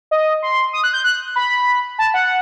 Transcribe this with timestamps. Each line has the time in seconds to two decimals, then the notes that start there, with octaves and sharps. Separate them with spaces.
0.11 D#5
0.43 C6
0.73 D#6
0.84 F#6
0.93 G6
1.04 F#6
1.36 B5
1.99 A5
2.14 F#5